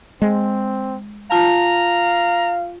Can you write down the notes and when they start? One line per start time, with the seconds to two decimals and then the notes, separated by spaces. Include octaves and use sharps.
0.22 G#3 C4
1.31 F4 F5 A5 A#5